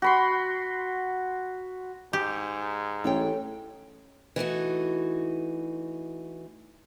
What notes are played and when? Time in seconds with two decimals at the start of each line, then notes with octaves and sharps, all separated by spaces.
0.02 F#4 B5 C6
2.13 G#2 G4
3.04 A1 A4 C#5 G5
4.36 E3 A3 D#4 F#4